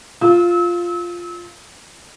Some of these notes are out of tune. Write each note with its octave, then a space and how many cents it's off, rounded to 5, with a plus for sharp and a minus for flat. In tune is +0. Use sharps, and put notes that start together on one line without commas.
F4 +0 E6 -35